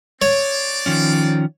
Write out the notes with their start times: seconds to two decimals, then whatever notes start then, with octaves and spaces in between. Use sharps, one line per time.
0.22 C4 C#5 D5
0.86 D#3 F3 C#4